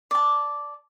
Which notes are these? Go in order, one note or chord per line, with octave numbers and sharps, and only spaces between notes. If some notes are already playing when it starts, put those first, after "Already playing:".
D5 A5